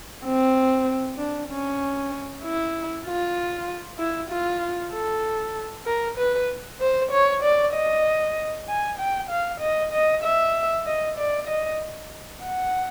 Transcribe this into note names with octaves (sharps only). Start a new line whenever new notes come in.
C4
D4
C#4
E4
F4
E4
F4
A4
A#4
B4
C5
C#5
D5
D#5
G#5
G5
F5
D#5
D#5
E5
D#5
D5
D#5
F#5